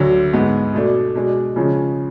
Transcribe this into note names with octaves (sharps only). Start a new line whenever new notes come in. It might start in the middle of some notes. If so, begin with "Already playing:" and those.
Already playing: D2 D3 F#3
G#2 G#3 B3
B2 A3 D4
B2 G#3 D4
C#3 F3 G#3 C#4